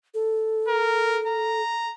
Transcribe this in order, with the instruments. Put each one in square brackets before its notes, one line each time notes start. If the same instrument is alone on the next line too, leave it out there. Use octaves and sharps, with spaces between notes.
[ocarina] A4
[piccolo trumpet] A#4
A#5